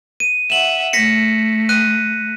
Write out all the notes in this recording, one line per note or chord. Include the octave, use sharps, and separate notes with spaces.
D#7
E5 F#5 E7 F#7
A3 A#6 B6 C#7
F#6 D#7